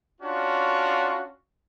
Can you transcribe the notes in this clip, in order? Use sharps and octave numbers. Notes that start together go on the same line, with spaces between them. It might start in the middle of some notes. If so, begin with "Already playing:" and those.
C#4 D4 F4 F#4